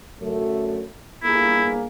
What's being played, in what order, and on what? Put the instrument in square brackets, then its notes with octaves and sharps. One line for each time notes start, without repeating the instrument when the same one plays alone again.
[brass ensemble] F#2 D3 A3
[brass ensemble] G1 A#3 G#4 [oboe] E4